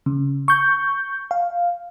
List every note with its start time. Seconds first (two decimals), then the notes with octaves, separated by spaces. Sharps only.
0.06 C#3
0.48 C#6 G6
1.31 F5